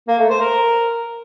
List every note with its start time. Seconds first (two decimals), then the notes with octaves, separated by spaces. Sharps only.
0.08 A#3
0.19 A3
0.29 C5
0.40 A#4